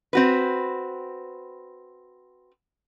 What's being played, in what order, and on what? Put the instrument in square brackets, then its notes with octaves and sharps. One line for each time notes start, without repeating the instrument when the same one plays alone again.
[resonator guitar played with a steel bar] C4 F#4 B4